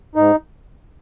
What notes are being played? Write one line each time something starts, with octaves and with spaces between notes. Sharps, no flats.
G#2 D#4